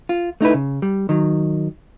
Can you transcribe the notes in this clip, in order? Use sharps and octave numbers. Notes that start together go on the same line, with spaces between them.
F4
A3 D#4 E4 B4
C#3
G3
D#3 F#3